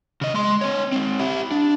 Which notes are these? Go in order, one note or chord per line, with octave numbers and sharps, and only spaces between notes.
C#3 D#5
G#3 C6
C4 C#5
G#3 C4
E4 G4
D4